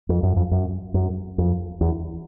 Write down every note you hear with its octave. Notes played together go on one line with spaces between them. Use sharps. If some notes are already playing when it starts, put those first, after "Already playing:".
F2
F#2
F2
F#2
F#2
F2
E2